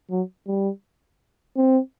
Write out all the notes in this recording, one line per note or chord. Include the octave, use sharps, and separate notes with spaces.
F#3
G3
C4